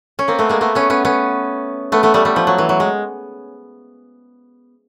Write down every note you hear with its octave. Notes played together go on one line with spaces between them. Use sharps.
C#4
A#3 C4
A3 B3
G#3 A#3
A3 B3
B3 C#4
B3 C#4
B3 C#4
A3 B3
A3 B3
G3 A3
G3 A3
F3
F#3
E3
F#3
G#3